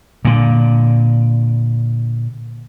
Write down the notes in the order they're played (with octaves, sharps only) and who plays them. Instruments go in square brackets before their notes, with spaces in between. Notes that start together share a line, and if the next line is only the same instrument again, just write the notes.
[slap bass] A#2 D3